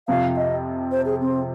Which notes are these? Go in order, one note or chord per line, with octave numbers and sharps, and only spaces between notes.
F2 C3 F3 F5
D#5
C5
G#4
C4